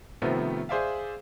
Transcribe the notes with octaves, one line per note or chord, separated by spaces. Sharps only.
C3 D#3 F3 A3 B3
G#4 C5 D5 E5 F5